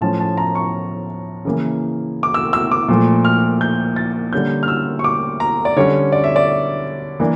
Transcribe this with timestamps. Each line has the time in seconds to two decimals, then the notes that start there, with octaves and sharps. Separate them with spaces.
0.01 A2 F3 C#4 A5
0.20 A5
0.38 A#5
0.55 C#6
1.45 C#3 E3 A#3
2.23 D6
2.34 E6
2.53 E6
2.72 D6
2.88 A#2 F3 A3
3.25 F6
3.61 G6
3.96 A6
4.33 D3 G3 A#3 C#4 G6
4.63 F6
4.68 E6
4.99 C#6
5.04 D6
5.40 A#5
5.65 D5
5.76 D3 G3 C#4 C#5
6.12 D5
6.24 E5
6.36 D5
7.20 E3 A#3 D4